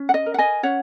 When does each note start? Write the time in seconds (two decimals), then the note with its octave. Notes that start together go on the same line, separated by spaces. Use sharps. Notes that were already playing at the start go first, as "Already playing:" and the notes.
Already playing: C#4
0.09 F#5
0.14 D#5
0.26 A#4
0.34 F#5
0.38 D#5 G#5
0.63 C#4 C#5 F#5